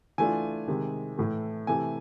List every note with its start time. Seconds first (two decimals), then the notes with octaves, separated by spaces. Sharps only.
0.18 E3 A3 D4 F4 G#5
0.68 C3 D#3 G#3
1.18 A2 E3 A3
1.67 C3 E3 A3 G#5